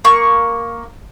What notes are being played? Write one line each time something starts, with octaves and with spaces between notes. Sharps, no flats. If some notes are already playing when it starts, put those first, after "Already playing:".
A#3 C#6